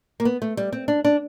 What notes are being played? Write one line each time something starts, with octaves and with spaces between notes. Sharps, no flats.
A#3
B3
A3
G3
C4
D4
D4